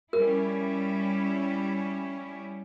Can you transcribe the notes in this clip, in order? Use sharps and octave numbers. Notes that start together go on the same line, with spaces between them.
G3 C#4 E4 A#4